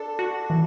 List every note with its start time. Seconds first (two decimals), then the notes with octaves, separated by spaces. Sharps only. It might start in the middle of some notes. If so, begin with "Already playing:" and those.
Already playing: D4 A4
0.19 F#4
0.50 E3